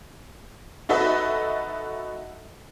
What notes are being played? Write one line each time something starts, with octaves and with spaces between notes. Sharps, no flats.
D#4 F#4 A4 B4 D#5 E5